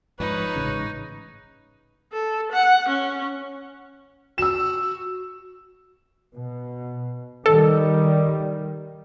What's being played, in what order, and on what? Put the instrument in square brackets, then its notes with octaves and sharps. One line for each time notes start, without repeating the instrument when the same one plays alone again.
[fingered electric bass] G#2 F3 [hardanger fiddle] D#4 [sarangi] B4 [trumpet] C#5
[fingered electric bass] A1 G#2 C#3
[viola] A4
F#5
C#4
[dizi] F#4 [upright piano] E6 E7
[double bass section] B2
[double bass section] D#3 G3 [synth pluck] A4